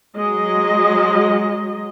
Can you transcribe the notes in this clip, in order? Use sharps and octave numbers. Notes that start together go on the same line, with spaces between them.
F#3 G#3 D#5